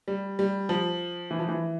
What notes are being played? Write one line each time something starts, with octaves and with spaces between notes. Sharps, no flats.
G3
G3
F3
E3
F3
E3